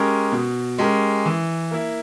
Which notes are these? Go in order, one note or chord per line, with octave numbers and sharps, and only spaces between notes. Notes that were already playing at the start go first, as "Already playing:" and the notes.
Already playing: G#3 C#4 G4 A#4
B2
G#3 C#4 G4 A#4
E3
A#3 E4